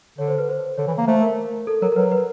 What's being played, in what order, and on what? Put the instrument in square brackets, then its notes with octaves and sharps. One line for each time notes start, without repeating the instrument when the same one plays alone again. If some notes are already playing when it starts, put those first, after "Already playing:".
[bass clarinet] D3 [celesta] C#5
[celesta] C5
B4
C5
[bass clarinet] D3 [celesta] C#5
[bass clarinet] E3
A#3
[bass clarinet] A3 [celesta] C5
[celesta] A#4
A4
[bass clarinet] F#3 [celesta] A#4
[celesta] A#4
[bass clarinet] F#3 [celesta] B4
[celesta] B4